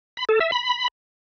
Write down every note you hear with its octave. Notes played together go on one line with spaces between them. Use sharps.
B5
A4
E5
B5